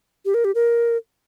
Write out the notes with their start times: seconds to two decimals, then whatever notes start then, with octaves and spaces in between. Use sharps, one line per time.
0.25 G4
0.34 A#4
0.45 G4
0.55 A#4